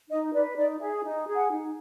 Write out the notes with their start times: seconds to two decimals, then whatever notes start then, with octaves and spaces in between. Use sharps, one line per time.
0.09 D#4 D#5
0.33 B4 D5
0.57 D#4 D5
0.80 G#4 E5
1.04 D#4
1.28 G#4
1.35 F#5
1.51 D#4